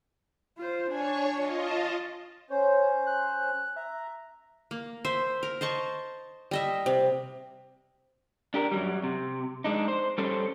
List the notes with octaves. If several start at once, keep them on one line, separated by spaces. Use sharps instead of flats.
F4 C5
D4 C#5 G#5 C#6
F4 D#5
A5
C#4 C5 C#5
F#6
E5 A#5
A#3
C5 E5
A#4
C5 D#5 A5 C#6
G3 D#5 E5
C3
D4 G4 A#4
F#2 F#3 G3
C3
G#3 D4 D#4
C5
G3 C#4 A4 C5